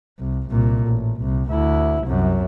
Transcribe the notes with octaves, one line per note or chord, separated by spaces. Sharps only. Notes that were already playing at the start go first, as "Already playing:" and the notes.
C2
C2 A#2
A1
C2
D2 E4
C2 F#2